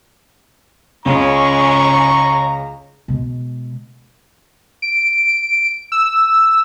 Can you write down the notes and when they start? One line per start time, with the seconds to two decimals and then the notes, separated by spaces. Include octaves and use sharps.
1.06 C#2 C#3 G#3 C#4 A#5 C#6
3.08 B2 G#3
4.82 D7
5.92 E6